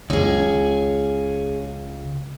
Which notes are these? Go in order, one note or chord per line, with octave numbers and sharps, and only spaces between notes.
C#2 C#4 G#4